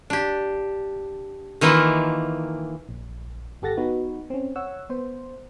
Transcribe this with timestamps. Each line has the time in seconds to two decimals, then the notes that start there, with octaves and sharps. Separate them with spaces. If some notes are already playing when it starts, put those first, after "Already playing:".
0.10 D4 G4
1.61 D#3 E3 A#3 E4 F4
2.89 A#1
3.62 G1 G4 A4 F#5 A6 A#6
3.77 B3 D#4 F#4 B4
4.30 C4 C#4
4.56 C#5 F#5 E6
4.90 B3 C5